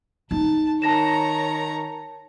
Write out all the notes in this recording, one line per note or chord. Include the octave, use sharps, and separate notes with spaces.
D#4 A5
D#3 C#5 A5 A#5 A#6 E7